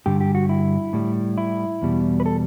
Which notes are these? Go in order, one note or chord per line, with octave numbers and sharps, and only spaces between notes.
G2 D3 G3 G4
G4
F#4
E4
A2 G3
E4
E2 B2 G3
B4
A4